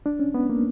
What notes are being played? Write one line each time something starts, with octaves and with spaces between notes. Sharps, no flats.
D4
C#4
B3
A#3